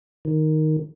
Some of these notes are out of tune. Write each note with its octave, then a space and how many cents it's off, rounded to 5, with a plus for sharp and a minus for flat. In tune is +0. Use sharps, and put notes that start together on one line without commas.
D#3 +0